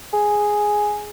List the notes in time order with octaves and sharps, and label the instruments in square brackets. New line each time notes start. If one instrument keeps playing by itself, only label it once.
[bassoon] G#4